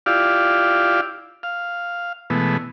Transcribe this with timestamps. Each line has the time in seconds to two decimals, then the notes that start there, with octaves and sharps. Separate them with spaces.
0.06 E4 F4 G4 D5 F5
1.43 F5
2.30 B2 E3 G#3 A3 B3